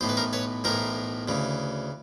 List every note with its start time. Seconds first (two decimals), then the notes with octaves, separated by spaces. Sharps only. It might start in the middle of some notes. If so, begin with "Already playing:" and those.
0.01 B1 A2 E3 C5
0.09 B4
0.17 A#4 C5
0.33 B4 C#5
0.64 B1 A2 E3 A#4 C5
1.28 D2 C#3 E3